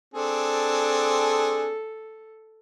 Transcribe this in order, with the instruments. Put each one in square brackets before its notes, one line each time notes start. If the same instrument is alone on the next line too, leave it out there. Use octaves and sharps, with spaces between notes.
[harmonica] C4 D4 G#4 [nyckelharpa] A4